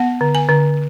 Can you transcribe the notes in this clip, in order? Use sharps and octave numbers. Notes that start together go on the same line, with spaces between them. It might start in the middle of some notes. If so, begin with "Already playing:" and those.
Already playing: B3 F#5
D3
G#5
D3